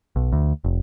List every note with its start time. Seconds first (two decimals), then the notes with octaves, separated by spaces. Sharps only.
0.16 B1
0.32 D2
0.64 F1